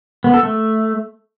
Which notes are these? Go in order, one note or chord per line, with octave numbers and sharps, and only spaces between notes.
B3
A4
A3